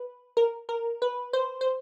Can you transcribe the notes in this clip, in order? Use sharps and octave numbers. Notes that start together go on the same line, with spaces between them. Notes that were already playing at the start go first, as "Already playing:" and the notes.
Already playing: B4
A#4
A#4
B4
C5
C5